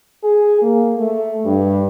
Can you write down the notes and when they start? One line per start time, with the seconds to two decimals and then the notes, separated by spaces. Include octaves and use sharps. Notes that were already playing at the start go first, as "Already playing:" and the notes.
0.23 G#4
0.61 A#3
0.98 A3
1.45 G2